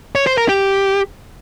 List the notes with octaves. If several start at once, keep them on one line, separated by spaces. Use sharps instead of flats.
C#5
C5
A#4
G4